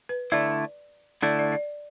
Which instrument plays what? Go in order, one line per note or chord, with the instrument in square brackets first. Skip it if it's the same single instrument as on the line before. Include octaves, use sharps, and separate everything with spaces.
[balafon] B4
[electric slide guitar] D3 A3 E4 [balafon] D5
[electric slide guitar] D3 A3 E4 [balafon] D5
[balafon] D5
D5